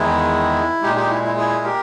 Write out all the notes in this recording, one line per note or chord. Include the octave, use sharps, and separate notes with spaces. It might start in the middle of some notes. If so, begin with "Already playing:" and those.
Already playing: E2 D#3 G#3 E4
A#2 G#3 D#4 G4
D#4 G4
E4
E4
E4 G#4
G4 A#4